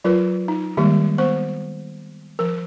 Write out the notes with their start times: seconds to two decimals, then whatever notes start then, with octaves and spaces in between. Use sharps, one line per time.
0.04 F#3 F4 A#4 B4
0.48 D#4
0.77 D#3 G3 G#3 A#3 G4
1.18 B3 C5 C#6
2.39 F3 A#4